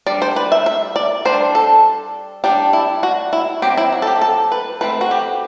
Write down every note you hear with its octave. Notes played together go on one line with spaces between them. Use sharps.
G3 D4 D5
C5
B4
E5
E5
D5
G3 D4 C5
A4
G3 D4 G4
E4
F#4
E4
F#3 C4 G4
E4
F#4
A4
G4
A4
B4
E3 A3 C4 B4
F#4
G4